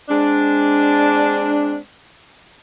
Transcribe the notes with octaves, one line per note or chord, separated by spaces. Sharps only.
G#3 C4 D4